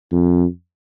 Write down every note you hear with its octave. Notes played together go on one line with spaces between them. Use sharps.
F2